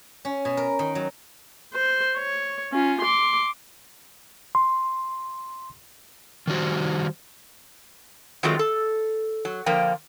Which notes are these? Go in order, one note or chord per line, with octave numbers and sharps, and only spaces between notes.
C#4
B2
A#4
D#3
F#3
C5
C#5
C#4 F4
C6 D6
C6
D#3 G3 F#4 C5
D#3 F#3 G#3 A3 C4 F4
A4
F#3
D3 F3 A#3 G5